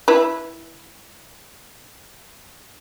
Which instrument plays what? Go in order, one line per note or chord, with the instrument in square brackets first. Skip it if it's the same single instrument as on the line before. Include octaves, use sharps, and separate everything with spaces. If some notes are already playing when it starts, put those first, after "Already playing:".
[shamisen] E4 B4